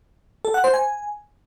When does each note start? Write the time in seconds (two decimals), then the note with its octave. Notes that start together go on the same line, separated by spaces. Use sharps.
0.45 A4
0.54 F#5
0.64 C5
0.74 G#5